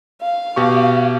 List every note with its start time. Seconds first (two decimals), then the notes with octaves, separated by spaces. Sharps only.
0.21 F5
0.56 B2 G4 C#6